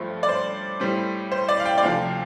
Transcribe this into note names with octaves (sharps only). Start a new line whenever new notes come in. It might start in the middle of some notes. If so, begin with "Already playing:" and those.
Already playing: G2 F3 A3 C4
D5
C5
A2 G3 C4
C5
D5
F5
G5
D5
D2 C3 F3 C4 F5